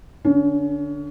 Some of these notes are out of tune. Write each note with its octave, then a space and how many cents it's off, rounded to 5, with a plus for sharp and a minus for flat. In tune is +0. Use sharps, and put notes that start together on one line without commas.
D3 +0 C#4 +30